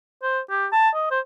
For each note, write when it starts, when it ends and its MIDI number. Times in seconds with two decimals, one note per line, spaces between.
0.23 0.40 72
0.49 0.66 67
0.72 0.89 81
0.95 1.10 75
1.11 1.20 72